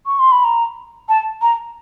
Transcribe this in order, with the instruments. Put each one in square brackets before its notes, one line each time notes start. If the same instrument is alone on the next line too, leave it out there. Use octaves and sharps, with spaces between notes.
[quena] C#6
C6
B5
A#5
A5
A#5